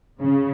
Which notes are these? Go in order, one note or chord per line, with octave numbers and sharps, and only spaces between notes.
C#3